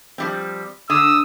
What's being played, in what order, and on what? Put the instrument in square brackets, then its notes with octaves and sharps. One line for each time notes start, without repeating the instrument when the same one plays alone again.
[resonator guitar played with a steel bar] F3 G3 C4
[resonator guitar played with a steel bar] D3 [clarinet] D#6 [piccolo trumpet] E6